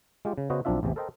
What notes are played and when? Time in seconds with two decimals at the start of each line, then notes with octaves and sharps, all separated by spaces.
0.25 G#3 F4 G4
0.38 C#3
0.50 C#3 B3 F#4 C5 D#5
0.65 B1 F3 C4 D4 F4 E5
0.83 A1 E2 C3 E3
0.96 A4 A#4 C5 D#5 G5 A#5